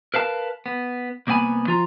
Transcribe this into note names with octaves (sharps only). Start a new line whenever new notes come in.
A#4 B4 F5 A5
B3
C2 A#3 B3 F#5 G#5 B5
F3 F4 A#5